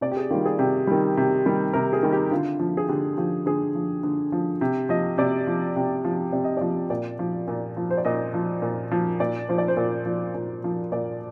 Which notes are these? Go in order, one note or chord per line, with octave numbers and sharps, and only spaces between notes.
C3 D5
G4
G#4
D#3 G3 F4
G#4
C3 G4
D#3 G3
C3
D#3 G3
C3 A#4
G#4
D#3 G3
G4
D3 F4
F3
G#4
D3 G4
F3 G4
D3 G#4
F3
D3
F3
C3
F3 D#5
C3 D5
F3
C3
F3
C3 D5
D#5
F3 D5
A#2 D5
F3
A#2
F3
C5
D5
A#2 D#5
F3
A#2
F3
A#2 D5
F3 C5
D5
C5
A#2
F3
A#2
F3
A#2 D5